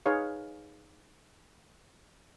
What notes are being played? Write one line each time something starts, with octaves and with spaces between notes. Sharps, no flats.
D#4 G#4 B4 C#5 F5